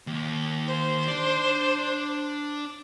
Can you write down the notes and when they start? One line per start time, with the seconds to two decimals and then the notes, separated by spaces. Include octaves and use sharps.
0.07 D#2
0.67 C5
1.08 D4 D5